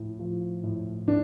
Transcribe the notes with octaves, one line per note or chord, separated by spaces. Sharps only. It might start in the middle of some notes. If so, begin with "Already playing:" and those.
Already playing: A2 F3
F3
A2
A2 D4